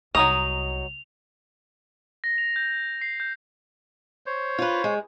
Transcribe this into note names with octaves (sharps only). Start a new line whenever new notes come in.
C2 F#3 D#4 D#5 D#6 F7
A#6
F7
G6
C7
G6
C5 C#5
F4 B4
G#3